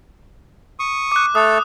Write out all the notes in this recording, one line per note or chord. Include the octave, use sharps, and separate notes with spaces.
C#6 D#6
D6 F#6
A3 A4 D#6